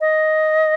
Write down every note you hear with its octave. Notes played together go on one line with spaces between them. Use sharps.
D#5